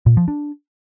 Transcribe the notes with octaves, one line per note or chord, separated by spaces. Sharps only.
A#2
F3
D4